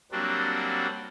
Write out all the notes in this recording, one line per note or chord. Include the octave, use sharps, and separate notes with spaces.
F#3 G3 A#3 C4 D4 F#4